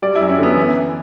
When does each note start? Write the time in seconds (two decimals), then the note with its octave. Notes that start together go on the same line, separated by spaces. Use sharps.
0.02 G3 D5
0.15 E4
0.21 F#2
0.29 C#4
0.38 D3 B3
0.57 E3